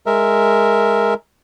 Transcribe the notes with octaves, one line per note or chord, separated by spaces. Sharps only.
G#3 A#4 E5